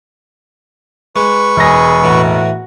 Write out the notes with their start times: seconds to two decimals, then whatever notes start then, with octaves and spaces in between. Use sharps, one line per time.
1.16 G#3 B4 C#6
1.57 E1 G#4 A#6
2.04 A2 E3 F#4